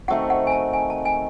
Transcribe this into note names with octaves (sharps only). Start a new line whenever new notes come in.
D#3 A3 C4 F#4 F#5
F#5
G#5
A5
G#5
A5
G#5